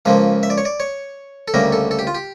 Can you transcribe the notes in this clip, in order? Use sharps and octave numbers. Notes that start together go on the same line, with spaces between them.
C#2 C#3 F3 A#3 F5
E5
D5
C#5
D5
C#5
A4
D2 C#3 G3 A#3 A#4
A4
A4
G4
F4
G4